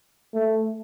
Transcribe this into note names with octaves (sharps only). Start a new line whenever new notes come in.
A3